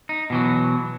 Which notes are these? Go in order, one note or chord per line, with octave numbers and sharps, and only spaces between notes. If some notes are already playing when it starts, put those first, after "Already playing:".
D#4
B2 E3 F#3